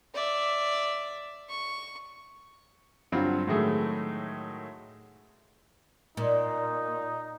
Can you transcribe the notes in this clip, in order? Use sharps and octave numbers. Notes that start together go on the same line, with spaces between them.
D5 E5
C#6
G2 D3 F#3 C4 F4
A2 D#3 F#3 G#3 A3 G#4
A#2 D#4